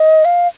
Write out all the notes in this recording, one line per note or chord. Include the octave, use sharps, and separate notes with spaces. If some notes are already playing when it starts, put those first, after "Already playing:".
Already playing: D#5
F5